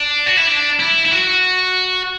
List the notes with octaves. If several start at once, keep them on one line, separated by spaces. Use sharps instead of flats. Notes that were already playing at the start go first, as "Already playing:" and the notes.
Already playing: D4
F#4
E4
D4
E4
E4
F#4